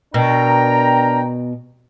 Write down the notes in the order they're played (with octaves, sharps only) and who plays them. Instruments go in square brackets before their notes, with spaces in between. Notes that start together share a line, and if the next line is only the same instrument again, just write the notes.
[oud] B2 [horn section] D4 A#5 [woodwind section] A#4 G5